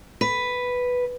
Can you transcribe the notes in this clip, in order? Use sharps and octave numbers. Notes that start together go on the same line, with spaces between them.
B4